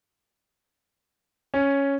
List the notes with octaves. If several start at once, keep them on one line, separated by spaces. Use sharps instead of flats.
C#4